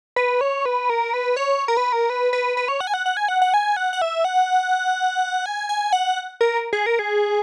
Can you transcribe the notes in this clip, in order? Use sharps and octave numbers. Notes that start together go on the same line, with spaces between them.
B4
C#5
B4
A#4
B4
C#5
A#4
B4
A#4
B4
B4
B4
C#5
F#5
G#5
F#5
F#5
G#5
F#5
F#5
G#5
F#5
F#5
E5
F#5
G#5
G#5
F#5
A#4
G#4
A#4
G#4